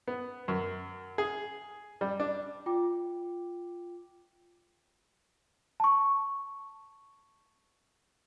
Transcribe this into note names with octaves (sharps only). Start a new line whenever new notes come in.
B3
F#2
G#4
G3
D4
F4 G5 D6
A5 C#6